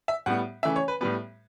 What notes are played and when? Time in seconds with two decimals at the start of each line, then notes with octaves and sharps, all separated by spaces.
0.08 E5
0.26 A2 G3 B3 F#5
0.63 C#3 E3 A3 E5
0.76 C#5
0.88 B4
1.01 A2 G3 B3 B4